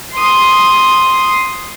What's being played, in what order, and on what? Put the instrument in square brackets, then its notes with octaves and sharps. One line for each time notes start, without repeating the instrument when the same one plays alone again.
[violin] C6 D#6